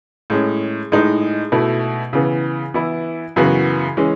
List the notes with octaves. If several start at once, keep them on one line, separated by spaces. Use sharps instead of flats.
A2 G#3 C#4
A2 G#3 D#4
B2 A3 E4
C#3 E3 B3
E3 B3 E4
F#2 C#3 E3 B3 F#4
E3 G#3 C#4